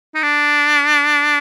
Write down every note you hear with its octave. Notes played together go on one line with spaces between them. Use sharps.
D#4
D4